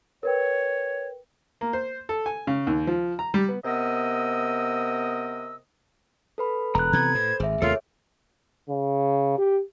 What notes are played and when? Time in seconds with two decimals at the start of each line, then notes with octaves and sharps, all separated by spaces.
0.23 A#4 B4 C#5 G5
1.61 A#3
1.73 C5
2.09 A4
2.26 G#5
2.47 C#3
2.67 D#2
2.87 F3
3.19 A#5
3.34 G3
3.48 B3
3.64 C3 B3 A#4 D#5 D#6 E6
6.38 A4 B4 B5
6.75 E1 A#5 F#6
6.93 C3 E3 B3 G#6
7.15 A2 C5
7.40 G#1 G#4 E5
7.62 D#2 C3 A3 F4 A4 A#4 C#5
8.69 C#3
9.38 G4